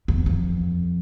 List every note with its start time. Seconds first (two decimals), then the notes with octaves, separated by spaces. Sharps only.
0.08 E2
0.26 F2